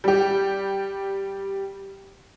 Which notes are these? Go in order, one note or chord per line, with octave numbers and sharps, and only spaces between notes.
G3 G4